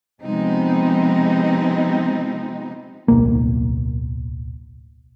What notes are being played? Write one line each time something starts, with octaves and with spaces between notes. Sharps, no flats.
C3 F3 G#3 B3 C4 D#4
D1 B1 A#3